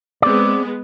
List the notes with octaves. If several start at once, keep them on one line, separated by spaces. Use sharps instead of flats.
G#3 B3 C4 D5